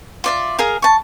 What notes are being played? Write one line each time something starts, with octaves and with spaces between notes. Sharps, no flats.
F4 D5 E5
G#4 A#4 F5
A5 C#6